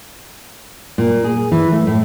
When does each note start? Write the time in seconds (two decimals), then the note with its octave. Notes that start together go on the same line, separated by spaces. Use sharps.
0.98 A#2
1.24 G#4
1.52 E3
1.72 A3
1.87 A2